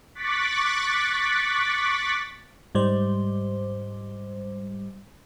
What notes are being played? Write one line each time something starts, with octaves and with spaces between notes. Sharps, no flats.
C#6 D6 F#6 A6 B6
G#2 G3 C5